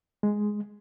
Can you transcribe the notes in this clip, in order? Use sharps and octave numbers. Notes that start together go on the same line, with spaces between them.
G#3